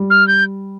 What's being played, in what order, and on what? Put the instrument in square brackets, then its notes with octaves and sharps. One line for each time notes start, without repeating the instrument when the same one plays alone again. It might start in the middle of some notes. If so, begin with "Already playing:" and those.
Already playing: [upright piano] G3
[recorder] F6
G6